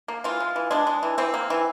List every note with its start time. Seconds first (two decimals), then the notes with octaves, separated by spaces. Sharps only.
0.08 A#3
0.24 E3 F4
0.40 G#3
0.56 E3
0.71 G#3 D4
0.87 G#3
1.03 E3
1.18 E3 C4
1.34 A#3
1.50 E3